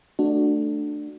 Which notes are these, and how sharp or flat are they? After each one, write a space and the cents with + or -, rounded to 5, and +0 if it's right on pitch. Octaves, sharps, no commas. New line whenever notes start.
A3 +0 D4 +15 F#4 +0